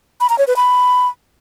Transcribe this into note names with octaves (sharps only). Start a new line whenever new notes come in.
B5
A#5
C#5
B4
B5